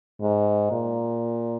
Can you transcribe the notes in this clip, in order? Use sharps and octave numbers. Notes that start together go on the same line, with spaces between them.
G#2
A#2